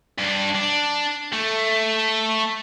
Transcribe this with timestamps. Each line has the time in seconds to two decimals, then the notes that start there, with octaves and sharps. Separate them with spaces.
0.18 G2 D4
0.55 D4
1.33 A3